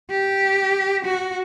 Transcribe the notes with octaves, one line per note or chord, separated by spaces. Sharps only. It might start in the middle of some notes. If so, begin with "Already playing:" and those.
G4
F#4